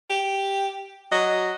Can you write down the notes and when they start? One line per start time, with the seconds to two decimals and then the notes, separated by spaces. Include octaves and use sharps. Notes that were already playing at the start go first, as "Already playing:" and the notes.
0.10 G4
1.12 F#3 D#5